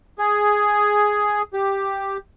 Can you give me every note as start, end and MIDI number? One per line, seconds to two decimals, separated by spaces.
0.19 1.42 68
1.53 2.17 67